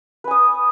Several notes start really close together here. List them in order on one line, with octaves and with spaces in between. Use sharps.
B4 G#5 D#6